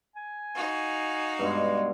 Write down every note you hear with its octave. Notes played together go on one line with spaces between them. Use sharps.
G#5
D#4 F#4 F5
G2 B2 G#3